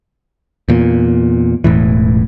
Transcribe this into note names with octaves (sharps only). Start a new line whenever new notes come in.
E2 A#2
E1 A2 E3